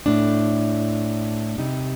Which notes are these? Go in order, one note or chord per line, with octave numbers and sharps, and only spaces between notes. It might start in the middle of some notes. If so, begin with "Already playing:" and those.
A2 A3 D4
C3 G3 D#4